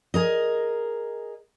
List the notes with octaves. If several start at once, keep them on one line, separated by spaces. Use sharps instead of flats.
G#4 A#4 D#5